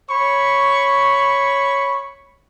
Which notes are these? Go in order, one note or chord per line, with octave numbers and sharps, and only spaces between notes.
C#5 B5 C#6